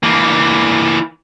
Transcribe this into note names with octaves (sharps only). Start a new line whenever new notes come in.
E3 A#3